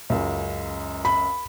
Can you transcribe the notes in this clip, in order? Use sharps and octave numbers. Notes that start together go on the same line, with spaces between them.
C#2 F#2
B5